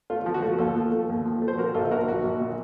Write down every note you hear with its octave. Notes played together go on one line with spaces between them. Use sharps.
A3 F4
F3
F#4
A3
D#2 F4 A4
F3
A3
D#2
F3
A3
C5
A#2 F#4 A#4
A#1 F4 A4
A#1 F#4 A#4
A#1 F#4
A#1
A#2